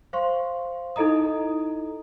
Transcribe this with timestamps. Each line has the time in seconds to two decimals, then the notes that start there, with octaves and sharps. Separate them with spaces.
0.13 C5 F5 C6 C#6
0.96 D#4 E4 A4 D#5 A#5 D#6